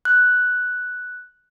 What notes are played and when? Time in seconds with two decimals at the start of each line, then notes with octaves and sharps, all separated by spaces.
0.05 F#6